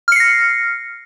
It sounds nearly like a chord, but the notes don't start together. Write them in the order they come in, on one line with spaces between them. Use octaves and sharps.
F6 C#7 C7 A#6